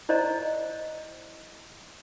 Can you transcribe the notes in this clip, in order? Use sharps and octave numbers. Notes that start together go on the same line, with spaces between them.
E4 C5 D5 D#5 A#5